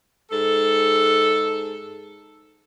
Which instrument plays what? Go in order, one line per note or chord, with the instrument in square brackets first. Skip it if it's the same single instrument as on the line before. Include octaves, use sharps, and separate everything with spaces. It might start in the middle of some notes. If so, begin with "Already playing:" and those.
[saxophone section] G#2 A4